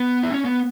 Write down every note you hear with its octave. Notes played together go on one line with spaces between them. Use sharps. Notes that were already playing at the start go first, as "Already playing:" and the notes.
Already playing: B3
E4
C#4
B3